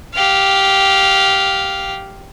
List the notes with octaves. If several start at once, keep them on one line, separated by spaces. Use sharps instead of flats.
G4 F5